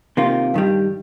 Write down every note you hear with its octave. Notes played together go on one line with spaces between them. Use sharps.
C3 D#3 A#3 F4
G2 D#3 G3